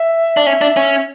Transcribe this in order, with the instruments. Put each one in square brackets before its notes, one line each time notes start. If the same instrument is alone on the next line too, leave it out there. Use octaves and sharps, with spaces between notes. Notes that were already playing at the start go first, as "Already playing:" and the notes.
Already playing: [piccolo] E5
[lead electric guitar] D4
[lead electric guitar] C#4 [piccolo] E5
[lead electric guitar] D4
C#4